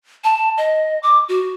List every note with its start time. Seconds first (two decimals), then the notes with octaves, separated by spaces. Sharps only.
0.24 A5
0.58 D#5
1.03 D6
1.29 F#4